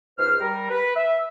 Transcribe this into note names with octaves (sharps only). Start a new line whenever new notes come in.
C#2 G#2 C5 F6
G3 A#4
B4
E5